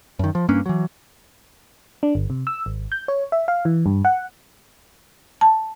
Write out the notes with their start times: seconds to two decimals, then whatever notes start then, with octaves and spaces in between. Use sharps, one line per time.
0.19 F#2 D#3
0.35 F3
0.49 G2 A#3 C#4 D4
0.66 E3 F#3
2.03 D4
2.15 G1
2.30 C3
2.47 E6
2.66 G#1
2.92 G6
3.08 C#5
3.32 E5
3.48 F5
3.65 E3
3.86 G2
4.05 F#5
5.41 A5